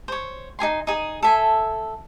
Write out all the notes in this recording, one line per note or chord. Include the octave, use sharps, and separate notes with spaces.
C5 C#5
D#4 G#4 G#5 C6
D#4 G#4
A4 E5 G#5